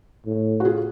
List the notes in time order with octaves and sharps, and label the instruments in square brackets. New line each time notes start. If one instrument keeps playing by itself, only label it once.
[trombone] A2
[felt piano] F#4
F4 G#4